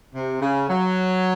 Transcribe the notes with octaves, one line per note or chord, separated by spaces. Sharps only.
C3
C#3
F#3